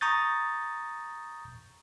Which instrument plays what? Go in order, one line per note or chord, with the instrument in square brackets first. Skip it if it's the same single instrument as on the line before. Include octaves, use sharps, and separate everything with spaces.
[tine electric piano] A#5 C#6 D#6 G6 A6